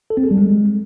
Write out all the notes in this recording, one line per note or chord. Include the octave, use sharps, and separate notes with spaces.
A4
C4
G#4
G3
G#3